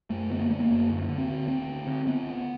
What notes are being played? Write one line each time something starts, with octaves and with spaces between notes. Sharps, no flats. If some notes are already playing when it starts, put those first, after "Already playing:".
F#2 A3
D3 B3
A#3
D3 A3
A#3
F#2
D2
D3
C4
D3
D2 C4
D2
D3
D3 B3
D2